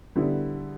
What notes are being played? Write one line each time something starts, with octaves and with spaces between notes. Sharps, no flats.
D3 G3 B3 E4